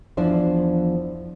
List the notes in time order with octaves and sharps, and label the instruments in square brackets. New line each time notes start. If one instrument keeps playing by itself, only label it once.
[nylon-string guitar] E2 F3 D4 E4 C5